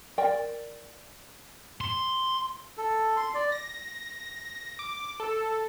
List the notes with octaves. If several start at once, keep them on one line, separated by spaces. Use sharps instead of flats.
A#4 D5 G5
C6
A4
C6
D5
A#6
D6
A4